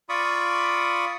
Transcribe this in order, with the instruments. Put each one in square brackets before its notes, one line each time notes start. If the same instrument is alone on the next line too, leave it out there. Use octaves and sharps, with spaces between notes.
[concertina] F4 D5 B5 C#6 D#6